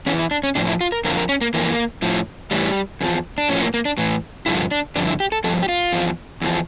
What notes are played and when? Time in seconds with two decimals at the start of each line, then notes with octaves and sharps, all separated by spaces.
0.06 E2 E3 C#4
0.19 E4
0.31 D4
0.43 C#4
0.55 A2 F3 D4
0.68 E4
0.81 F4
0.92 A#4
1.04 F2 D3 F3 A#4
1.17 A#4
1.29 C#4
1.41 A#3
1.54 F2 E3 A#3
2.02 A2 F3
2.51 A2 E3 G3
3.01 E2 D3 F3
3.38 D4
3.49 A2 F3 C#4
3.61 A#3
3.74 A#3
3.85 D4
3.98 A2 E3
4.46 G2 D3 F3 E4
4.71 D4
4.95 G2 D3 F3 D4
5.07 E4
5.20 G4
5.32 A4
5.44 G2 F3 A4
5.63 G4
5.69 F4
5.92 E2 D3 F3
6.41 E2 D3 F3